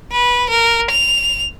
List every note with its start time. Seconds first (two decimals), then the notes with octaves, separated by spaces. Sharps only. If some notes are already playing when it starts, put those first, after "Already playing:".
0.12 B4
0.50 A#4
0.91 F7